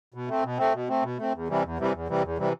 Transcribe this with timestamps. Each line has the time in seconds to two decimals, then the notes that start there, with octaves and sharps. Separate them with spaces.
0.14 B2
0.28 A3 C4
0.43 B2
0.58 A3 C4
0.74 B2
0.89 A3 C4
1.03 B2
1.18 A3 C4
1.33 E2
1.48 C3 E3 G3
1.63 E2
1.78 C3 E3 G3
1.93 E2
2.08 C3 E3 G3
2.23 E2
2.38 C3 E3 G3